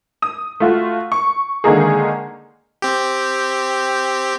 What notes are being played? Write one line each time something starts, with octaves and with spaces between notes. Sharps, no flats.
D#6
A3 F4 F#4
C#6
D3 D#3 G#3 A#3 D#4 G#4
C4 G4